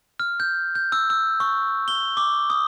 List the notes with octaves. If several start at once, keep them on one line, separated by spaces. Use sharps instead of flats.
F6
G6
G6
E6
E6
C#6
G7
D6
D#6